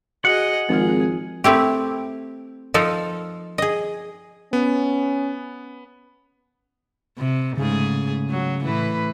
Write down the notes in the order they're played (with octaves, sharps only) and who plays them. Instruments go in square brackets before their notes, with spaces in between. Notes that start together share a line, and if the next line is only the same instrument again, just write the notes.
[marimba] F#4 [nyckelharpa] G#4 D#5 [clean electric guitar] F#5
[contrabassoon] G#1 [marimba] F3 C4 F4 [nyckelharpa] G#4
[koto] A3 C4 E4 G4
F3 D#4 A4 F5
G#4 D#5
[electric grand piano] B3 [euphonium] C#4
[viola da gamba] C3
[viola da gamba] G#2 A3 G#4 [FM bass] C#3
[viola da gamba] F#3
A2 E3 B4